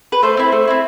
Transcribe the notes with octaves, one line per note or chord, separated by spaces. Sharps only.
B4
A3 C5
C4 E4
A3
C4 E4